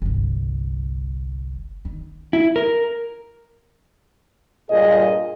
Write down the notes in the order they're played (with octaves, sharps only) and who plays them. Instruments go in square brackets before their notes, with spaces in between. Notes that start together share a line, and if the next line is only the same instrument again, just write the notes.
[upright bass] G1 C2
D#3
[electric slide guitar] E4
A#4
[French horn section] G2 A#2 F4 G#4 D#5